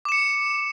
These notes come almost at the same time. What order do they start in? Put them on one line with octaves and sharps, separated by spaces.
D6 E7 C#7